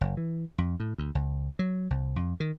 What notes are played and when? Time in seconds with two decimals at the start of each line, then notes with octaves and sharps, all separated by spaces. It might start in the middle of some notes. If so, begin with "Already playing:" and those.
0.01 F#1
0.17 E3
0.58 F2
0.80 A2
0.98 D2
1.15 C#2
1.59 F#3
1.90 C2
2.16 F2
2.40 D#3